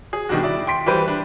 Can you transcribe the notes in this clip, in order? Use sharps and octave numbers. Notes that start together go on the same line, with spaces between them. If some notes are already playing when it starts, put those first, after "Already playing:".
G#4
B2 D#3 G3 D4 F#4
E4 D5
G5 C6 B6 D7
E3 G3 G4 B4 C5
D4